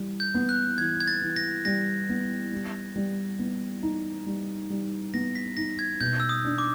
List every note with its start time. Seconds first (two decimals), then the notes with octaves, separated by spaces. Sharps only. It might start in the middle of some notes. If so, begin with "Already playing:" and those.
Already playing: E3 G3
0.20 G6
0.34 B3
0.49 F#6
0.78 E3 G#6
1.00 G#6
1.08 A6
1.22 E3
1.36 A#6
1.65 G3 A#6
2.09 B3
2.53 G3
2.96 G3
3.39 B3
3.83 D#4
4.26 G3
4.70 G3
5.14 B3 A#6
5.35 B6
5.57 D#4 A#6
5.79 G#6
6.01 B2 G6
6.20 E6
6.29 D#6
6.45 D4
6.58 D6